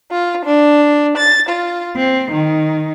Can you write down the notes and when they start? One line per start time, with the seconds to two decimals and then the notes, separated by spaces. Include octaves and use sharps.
0.11 F4
0.44 D4
1.17 A6
1.49 F4
1.97 C4
2.33 D#3